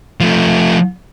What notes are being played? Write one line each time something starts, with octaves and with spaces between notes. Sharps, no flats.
F3 A3